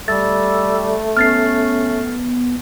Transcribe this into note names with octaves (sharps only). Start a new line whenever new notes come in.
G3 A3 E6 A6
B3 C#4 F6 A6 C7